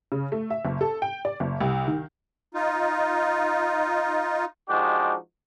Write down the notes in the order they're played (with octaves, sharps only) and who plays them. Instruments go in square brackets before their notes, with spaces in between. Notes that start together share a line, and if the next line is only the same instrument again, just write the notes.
[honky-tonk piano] C#3
A3
E5
F#1
A4
G5
D5
F#1
C2
D#3
[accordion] D#4 F4
[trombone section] F3 G#3 D4 D#4 F#4 G4